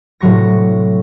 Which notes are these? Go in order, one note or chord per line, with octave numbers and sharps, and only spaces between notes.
A2 C3 F#3 C#6 A#6